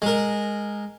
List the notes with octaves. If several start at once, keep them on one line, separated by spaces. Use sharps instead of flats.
G#3 A#4